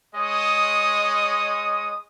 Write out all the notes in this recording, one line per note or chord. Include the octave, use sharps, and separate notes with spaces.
G#3 C#5 D#5 D#6